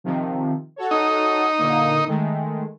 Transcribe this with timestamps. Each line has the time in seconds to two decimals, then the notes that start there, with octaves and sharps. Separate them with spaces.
0.04 C3 D#3 F3
0.76 F#4 A4 C#5
0.91 D#4
1.58 A#2 D3 A#3
2.07 D#3 G#3 A3